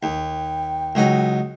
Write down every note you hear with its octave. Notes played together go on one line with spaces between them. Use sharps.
D#2 G5
C#2 F#3 D#4